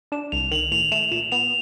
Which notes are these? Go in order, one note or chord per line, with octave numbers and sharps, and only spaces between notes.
D4 E7
C2 F7
D#3 F#7
A2 F7
A3 E7
A#2 E7
B3 F7